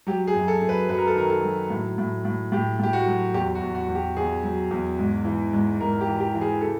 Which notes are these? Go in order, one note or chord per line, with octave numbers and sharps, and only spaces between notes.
F#3 G4
G#4
F#2
A4
F#2
B4
F#2 B4
A#4
A4
D#3 A#4
A4
F#3
A2
A2
A2
A2 G4
A2 G4
F#4
F#3
E2 G4
F#4
E2
F#4
E2
G4
E2 G#4
F#3
E2
G#2
E3
G#2
G#2 A#4
G4
E3
G4
E3
G#4
C#3 A4